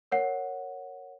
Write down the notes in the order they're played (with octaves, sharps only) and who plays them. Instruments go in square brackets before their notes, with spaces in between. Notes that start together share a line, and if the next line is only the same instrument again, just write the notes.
[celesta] A#4 C#5 F#5